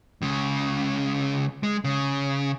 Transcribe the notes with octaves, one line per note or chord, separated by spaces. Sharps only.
C#2 C#3
G#3
C#3